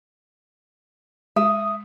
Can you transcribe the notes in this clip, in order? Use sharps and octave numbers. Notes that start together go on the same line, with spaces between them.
G#3 E5 D#6